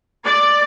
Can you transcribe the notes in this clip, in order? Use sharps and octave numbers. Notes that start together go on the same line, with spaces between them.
D5